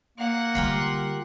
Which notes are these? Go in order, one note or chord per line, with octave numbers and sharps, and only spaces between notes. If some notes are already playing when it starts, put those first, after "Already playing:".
A#3 F#5
D3 G3 F4 G4 A#4